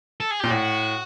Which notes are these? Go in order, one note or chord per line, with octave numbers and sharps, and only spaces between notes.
A4
G#4
A#2 G4
A2 F#4